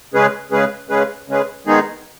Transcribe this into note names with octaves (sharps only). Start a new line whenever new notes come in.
C#3 G#3 C#4 G#4 B4
C#3 G#3 C#4 G#4 B4
C#3 G#3 C#4 G#4 B4
C#3 G#3 C#4 G#4 B4
D#3 G#3 B3 D#4 G#4